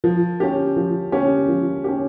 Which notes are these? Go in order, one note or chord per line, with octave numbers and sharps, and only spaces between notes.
F3
C#4 G4
F3
C#4 G4
F3
C#4 G4